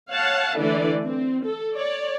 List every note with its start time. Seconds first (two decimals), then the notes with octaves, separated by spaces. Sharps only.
0.10 C#5 F5 F#5 A5
0.56 D3 E3 A3 D4 D5
1.03 C4
1.45 A4
1.75 C#5 D5